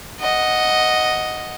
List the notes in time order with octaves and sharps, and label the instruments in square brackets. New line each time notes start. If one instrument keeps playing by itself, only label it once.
[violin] D#5 F#5